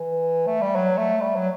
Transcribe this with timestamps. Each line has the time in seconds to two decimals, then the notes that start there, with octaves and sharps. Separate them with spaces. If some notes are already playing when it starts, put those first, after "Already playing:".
Already playing: E3
0.47 A3
0.61 G3
0.75 F#3
0.97 A3
1.21 G3
1.35 F#3